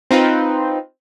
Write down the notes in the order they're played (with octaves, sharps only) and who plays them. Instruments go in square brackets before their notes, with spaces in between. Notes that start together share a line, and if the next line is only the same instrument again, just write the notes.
[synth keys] C4 D#4 F4 B4